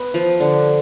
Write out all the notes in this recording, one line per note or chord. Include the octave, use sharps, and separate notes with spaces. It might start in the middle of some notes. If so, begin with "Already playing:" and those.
Already playing: B3
F3
D3